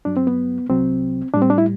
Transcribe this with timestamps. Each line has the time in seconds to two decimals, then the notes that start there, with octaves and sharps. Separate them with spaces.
0.05 G2 F#3 D4
0.17 C4
0.27 B3
0.69 C2 C3 F#3 C4
1.34 A2 G3 D4
1.42 C4
1.50 D4
1.58 E4